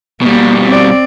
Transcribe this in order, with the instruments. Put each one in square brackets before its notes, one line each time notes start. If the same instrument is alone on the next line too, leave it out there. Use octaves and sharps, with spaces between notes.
[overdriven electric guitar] B2 G3 [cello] A#3
[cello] C4 D5